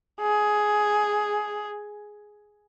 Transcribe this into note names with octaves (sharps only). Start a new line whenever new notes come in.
G#4